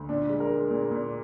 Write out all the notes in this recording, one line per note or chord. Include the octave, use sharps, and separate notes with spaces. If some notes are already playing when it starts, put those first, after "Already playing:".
Already playing: D2
A#2 D4
G#3
A#4
G#3
A#2 G#4
A#2